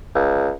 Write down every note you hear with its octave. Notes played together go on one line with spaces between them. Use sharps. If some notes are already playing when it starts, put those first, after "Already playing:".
C#2